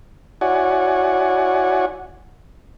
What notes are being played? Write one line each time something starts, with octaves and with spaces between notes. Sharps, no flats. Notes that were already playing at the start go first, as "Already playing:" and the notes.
E4 F#4 C#5 D5 F#5 G#5